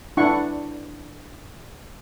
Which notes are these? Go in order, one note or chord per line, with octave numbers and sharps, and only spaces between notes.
D4 E4 F#5 C#6